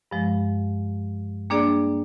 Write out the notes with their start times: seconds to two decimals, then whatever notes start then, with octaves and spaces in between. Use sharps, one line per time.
0.11 G2 F3 G#3
1.50 G3 A#3 D4 G#4 D5